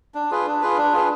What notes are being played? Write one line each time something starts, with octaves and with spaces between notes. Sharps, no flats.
D4
F4 G#4 B4
D4
F4 G#4 B4
D4
F4 G#4 B4